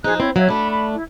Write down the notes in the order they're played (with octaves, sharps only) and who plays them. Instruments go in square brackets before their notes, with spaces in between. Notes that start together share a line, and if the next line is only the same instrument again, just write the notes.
[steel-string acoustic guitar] F3 D#4 [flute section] G#4 C5 F#6
[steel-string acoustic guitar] C4 [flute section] E4 C#5
[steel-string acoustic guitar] F#3 [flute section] C#5 E5 F5
[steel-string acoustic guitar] A3 D4 [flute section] B5
[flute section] B5
E4